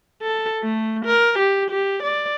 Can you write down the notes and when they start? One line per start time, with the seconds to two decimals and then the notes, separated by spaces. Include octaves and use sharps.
0.22 A4
0.63 A3
1.06 A#4
1.39 G4
1.71 G4
2.03 D5